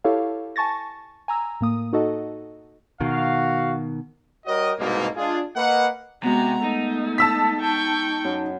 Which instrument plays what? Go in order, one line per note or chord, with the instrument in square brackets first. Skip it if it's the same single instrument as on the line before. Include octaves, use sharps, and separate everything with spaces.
[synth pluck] E4 G4 A4 C#5 F5
G#5 A5 C#6 A6 A#6
G#5 A#5 E6
A2 A#3 D#6
D#4 F#4 A4 D#5
[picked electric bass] B2 D#3 [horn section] F#4 F5
[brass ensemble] G3 F#4 G4 A#4 C#5 D#5
C2 G#2 B2 A#3
G#3 D4 F4 G#4
A#3 B4 D#5 F#5
[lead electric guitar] C3 [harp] G#3 B3 [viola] F#4 A#5
[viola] A3 [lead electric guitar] D#4
[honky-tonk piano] A5 E6 B6
[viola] G5 C#6
[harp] F#2